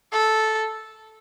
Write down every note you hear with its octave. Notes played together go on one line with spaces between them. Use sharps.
A4